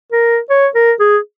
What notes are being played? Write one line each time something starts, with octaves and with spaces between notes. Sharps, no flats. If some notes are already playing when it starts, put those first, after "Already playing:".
A#4
C#5
A#4
G#4